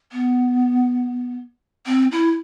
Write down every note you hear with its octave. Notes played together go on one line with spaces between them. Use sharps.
B3
C4
E4